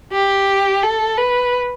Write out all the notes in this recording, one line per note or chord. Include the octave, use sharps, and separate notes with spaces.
G4
A4
B4